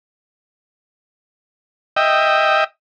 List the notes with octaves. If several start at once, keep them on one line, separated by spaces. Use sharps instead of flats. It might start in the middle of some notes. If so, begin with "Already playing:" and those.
D#5 E5 G5